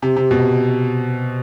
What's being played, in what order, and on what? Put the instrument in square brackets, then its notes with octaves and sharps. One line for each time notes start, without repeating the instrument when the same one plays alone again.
[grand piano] C3
C3
B2